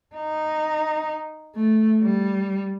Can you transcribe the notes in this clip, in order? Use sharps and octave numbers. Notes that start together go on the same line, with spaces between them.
D#4
A3
G3